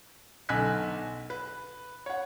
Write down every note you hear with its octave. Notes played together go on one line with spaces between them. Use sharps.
B1 D3 G#5 F6 F#6 B6
B4
C#5 F#5